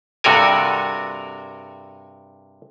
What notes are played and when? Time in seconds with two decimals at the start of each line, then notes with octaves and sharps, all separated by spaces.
0.24 G2 C3 F#4 A4 A#4 G#5